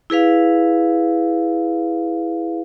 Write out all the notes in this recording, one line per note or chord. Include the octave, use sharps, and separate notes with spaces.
E4 G#4 B4 F5